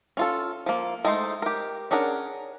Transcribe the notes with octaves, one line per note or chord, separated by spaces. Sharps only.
C#4 F4 A4
F3 A#3
G#3 A3 D#4 E4 C5
G4 A#4
C#4 D4 G#4 A#4 F#5